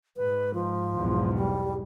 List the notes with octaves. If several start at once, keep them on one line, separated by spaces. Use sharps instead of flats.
G#2 B4
F3
B1 E2 G#2
G3